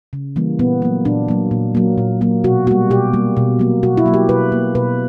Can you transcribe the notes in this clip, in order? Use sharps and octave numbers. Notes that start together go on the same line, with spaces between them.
C#3
E3 G3 A#3
A#2 B3
F#3 A#3
A#2 D4
F#3 A#3
A#2
F#3 A#3
A#2
F#3 A#3
B2 F#4
G3 A#3 F#4
B2 G4
G3 A#3
B2
F#3 A#3
B2 F#4
E4
F#3 A#3
G4
B2 B4
A#3
B2 B4